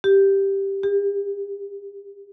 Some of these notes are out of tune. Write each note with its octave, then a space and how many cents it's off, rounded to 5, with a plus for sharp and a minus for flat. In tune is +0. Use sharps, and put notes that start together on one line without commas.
G4 +0
G4 +40